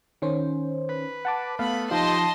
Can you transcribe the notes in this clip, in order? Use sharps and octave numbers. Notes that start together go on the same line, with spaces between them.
D#3 C#4 C5
B4
F#5 A5 D6
A3 B3 F5 B5
F3 D#4 F4 G4 D#5 A5 C6